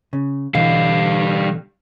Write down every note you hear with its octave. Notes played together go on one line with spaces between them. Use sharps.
C#3
B2 D3 E3 G3 F5